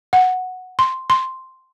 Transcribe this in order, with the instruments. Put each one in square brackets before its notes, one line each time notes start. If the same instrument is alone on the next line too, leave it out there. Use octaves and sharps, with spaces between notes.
[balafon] F#5
C6
C6